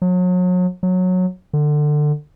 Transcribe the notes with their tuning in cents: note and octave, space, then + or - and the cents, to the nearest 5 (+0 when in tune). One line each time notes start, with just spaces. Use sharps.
F#3 -35
F#3 -15
D3 +20